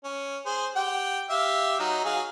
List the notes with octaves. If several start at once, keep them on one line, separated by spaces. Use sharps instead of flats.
C#4
G#4 C5
G4 F#5 G5
G4 E5 F5
F#3 D#4
F#3 G#4 F5